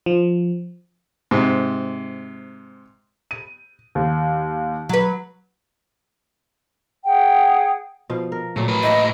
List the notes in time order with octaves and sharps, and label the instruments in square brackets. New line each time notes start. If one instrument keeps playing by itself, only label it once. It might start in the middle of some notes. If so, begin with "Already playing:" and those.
[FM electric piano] F3
[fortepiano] G#2 C3
[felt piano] D#7
D#2
[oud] F#3 B4
[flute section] G#4 F#5 G5
[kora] B2 F3 F5
A#4
[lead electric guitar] A#2 [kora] F#3 A3
[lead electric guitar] A2 B4 [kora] A#4
[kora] A#3 E4 G5 [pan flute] D#5